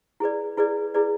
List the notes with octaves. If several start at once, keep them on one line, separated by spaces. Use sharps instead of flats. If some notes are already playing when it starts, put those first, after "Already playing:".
E4 G#4 B4 D5
E4 G#4 B4 D5
E4 G#4 B4 D5